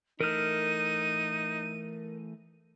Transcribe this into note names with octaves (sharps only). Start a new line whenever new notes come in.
E3 A3 D#4 A#4 F6 D#7